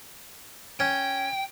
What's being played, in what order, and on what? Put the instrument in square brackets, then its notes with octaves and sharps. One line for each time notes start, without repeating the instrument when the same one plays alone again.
[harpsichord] C#4 [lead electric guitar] G5